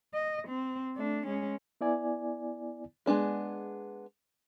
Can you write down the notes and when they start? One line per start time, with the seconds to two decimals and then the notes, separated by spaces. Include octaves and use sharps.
0.14 D#5
0.48 C4
0.96 A3 D4
1.27 G#3 C#4
1.81 B3 E4 D5 G#5
3.06 G#3 B3 D4 G#4